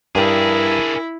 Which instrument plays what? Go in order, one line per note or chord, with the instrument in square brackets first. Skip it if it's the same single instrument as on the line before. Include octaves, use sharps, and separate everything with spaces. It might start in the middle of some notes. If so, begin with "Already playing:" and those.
[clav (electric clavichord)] G2 G5 [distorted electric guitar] D4 G#4 [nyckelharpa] E4 [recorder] A#4